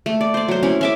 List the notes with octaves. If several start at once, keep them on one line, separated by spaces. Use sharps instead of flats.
A3
D5
C5 D5
F#3 C5
C4 C#4 E4
C#4 E5 D6